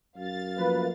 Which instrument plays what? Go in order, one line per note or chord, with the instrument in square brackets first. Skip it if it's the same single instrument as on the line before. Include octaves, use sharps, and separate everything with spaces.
[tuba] F#2 [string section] F5 A6
[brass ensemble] F3 A3 A#3 [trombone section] B4